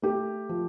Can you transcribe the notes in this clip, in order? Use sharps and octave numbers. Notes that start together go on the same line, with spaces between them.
A3 G4
F3